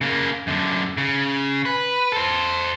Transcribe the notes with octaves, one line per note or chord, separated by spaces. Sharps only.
C#3 A#3
F#2 D3
C#3
B4
A4 C5